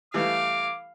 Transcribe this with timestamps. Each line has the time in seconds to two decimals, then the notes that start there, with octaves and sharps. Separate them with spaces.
0.14 E3 G3 A3 F5 D6